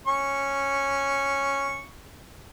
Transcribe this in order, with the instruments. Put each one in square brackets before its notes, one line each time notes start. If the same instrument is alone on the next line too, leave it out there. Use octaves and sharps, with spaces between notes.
[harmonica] C#4 C#6